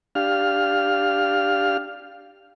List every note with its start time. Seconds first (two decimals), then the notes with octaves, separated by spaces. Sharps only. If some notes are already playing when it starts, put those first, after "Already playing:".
0.15 D4 G4 F5 F6